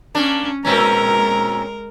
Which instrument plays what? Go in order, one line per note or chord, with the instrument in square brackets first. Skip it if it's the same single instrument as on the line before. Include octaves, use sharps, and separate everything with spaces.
[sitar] A#3 D4 [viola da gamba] C#4
[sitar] A#2 C4 C#4 [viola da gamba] G#3 A#4 [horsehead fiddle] A#5